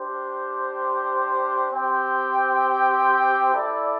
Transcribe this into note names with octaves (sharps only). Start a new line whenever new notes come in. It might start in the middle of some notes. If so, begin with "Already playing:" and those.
Already playing: D4 G4 C5
C4 G4 C5 G5
E4 A4 D5